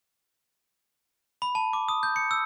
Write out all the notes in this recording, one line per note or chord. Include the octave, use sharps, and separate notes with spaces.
B5
A5
D6
D#6
G6
C#7
E6